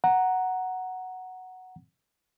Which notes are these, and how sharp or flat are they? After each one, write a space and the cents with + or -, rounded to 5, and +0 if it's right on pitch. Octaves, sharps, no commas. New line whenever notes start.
F#5 +0 A#5 +0